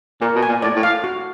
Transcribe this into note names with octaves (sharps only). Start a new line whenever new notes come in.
A#2 A#4
B2
G#5
A#2
A2 D5
A2
F5
F#4